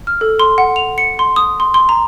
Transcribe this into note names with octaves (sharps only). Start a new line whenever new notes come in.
F6
A4
C6
F#5
F7
C#7
C6
D#6
C6
C6
A#5